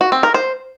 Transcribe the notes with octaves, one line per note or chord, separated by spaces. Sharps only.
F#4
C4
A#4
C5